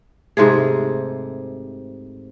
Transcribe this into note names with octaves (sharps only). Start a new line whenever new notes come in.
G#2 C3 A3 G#4